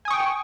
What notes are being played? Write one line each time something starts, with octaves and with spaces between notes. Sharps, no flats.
G5 G#5 C#6 D#6